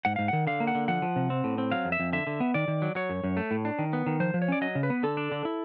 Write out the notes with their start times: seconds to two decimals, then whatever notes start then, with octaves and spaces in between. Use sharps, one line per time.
0.05 G#2 F#5
0.16 G#2 F5
0.28 D#3 F#5
0.47 D3 F5
0.60 A#3
0.67 F#5
0.75 D3
0.88 F3 F#5
1.02 F3
1.16 C3
1.30 C4
1.44 A2
1.58 C4
1.72 F#3 F5
1.85 F2
1.92 E5
2.00 F2
2.13 D3 E5
2.27 D3
2.40 B3
2.54 D#3 D5
2.68 D#3
2.82 F#3
2.95 F#3 C#5
3.10 F#2
3.24 F#2
3.37 A3
3.51 A2
3.65 D4
3.79 D#3
3.93 B3
4.06 D#3
4.20 F3 C5
4.34 F3
4.42 C#5
4.48 C#4 D5
4.61 F#3 D#5
4.75 C#3
4.83 B4
4.90 B3
5.03 D3 A4
5.17 D4
5.32 D3
5.45 E4